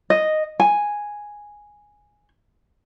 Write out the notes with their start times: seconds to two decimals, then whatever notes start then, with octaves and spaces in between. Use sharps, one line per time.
0.10 D#5
0.60 G#5